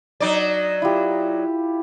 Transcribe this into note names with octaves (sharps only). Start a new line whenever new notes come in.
F#3 D#4 D5
E4 F4 G4